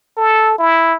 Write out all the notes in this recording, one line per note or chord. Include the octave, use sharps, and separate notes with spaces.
A4
E4